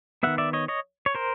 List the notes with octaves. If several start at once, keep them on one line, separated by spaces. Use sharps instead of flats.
D#3 G3 B3 E5 F#5
D5 E5
C#5 D#5
C#5 D#5
C#5
A#4 C5